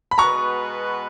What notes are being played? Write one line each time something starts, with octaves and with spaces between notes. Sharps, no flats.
B5
B2 G#3 B3 F#4 B4 A#5 C#6